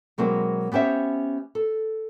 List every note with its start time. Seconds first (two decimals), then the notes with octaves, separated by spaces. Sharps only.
0.18 B2 F#3 G#3 A#3 C4
0.72 B3 C#4 G4 C5 E5
1.55 A4